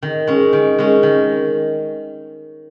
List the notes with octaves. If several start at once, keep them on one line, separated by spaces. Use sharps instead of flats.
D#3
G#3 C#4
D#3
G#3 C#4
D#3